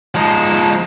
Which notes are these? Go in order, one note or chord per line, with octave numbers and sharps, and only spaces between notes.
F3 G#3 D#4 A5